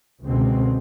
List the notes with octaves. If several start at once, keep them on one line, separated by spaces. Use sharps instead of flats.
C#2 B2 D3 G#3 C4